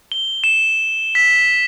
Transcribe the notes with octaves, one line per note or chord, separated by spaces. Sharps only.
G7
E7
B6